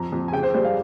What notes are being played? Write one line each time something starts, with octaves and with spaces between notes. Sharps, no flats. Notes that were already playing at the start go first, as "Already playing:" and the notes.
Already playing: F2 A#5
F2
G#5
C#3 G5
C5
G3 C5
F5